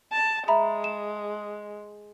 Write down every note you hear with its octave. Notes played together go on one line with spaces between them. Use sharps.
A5
G#3 E5 A#5 B5
E7